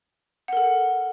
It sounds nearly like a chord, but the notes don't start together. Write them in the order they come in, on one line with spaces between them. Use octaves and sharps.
F#5 A#4 A4